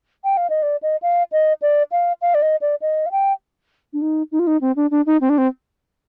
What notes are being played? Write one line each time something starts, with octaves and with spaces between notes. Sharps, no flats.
G5
F5
D#5
D5
D#5
F5
D#5
D5
F5
F5
D5
D#5
D5
D#5
F5
G5
D4
D#4
D#4
F4
D#4
C4
D4
D4
D#4
C4
D4
C4